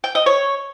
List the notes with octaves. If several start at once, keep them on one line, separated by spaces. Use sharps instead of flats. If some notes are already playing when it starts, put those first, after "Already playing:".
G5
D#5
C#5